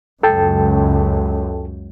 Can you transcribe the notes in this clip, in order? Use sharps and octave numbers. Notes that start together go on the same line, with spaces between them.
C#2 F#2 A4 G5 A5